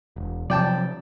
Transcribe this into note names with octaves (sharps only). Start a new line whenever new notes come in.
E1
C3 F3 F#3 D5 G5 A5